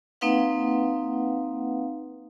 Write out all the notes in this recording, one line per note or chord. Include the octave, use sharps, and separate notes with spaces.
A#3 C4 D#4 B4 F5 F#5